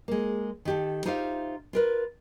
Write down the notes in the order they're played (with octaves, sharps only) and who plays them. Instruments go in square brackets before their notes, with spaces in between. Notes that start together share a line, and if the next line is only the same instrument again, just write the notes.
[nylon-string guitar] G#3 A#3
D#3 G4 A4
D#4 F4 G4 C5 E5 F5
F4 A#4 B4